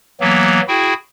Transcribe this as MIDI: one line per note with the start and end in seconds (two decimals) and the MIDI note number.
0.21 0.61 52
0.21 0.61 54
0.21 0.61 58
0.21 0.61 59
0.68 0.93 64
0.68 0.93 66
0.68 0.93 68
0.68 0.93 79